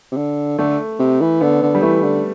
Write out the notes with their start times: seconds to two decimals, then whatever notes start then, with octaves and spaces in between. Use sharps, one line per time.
0.12 C3
0.17 D3
0.59 D3 A3
0.99 C3
1.21 E3
1.41 D3 B3
1.63 D3
1.75 G3
1.82 E3 A3
2.03 D3